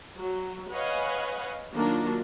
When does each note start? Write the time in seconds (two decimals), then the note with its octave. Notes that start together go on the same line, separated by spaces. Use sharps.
0.18 F#3
0.72 B4 C#5 D#5 F5 F#5 G#5
1.73 D#3 F#3 A#3 D4 F4 A#4